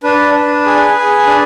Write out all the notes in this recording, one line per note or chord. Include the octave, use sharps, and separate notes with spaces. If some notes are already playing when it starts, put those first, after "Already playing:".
D4 B4
D4
G#4
G#4
D4